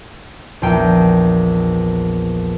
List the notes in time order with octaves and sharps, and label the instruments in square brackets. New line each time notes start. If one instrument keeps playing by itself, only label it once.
[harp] A#1 E2 G5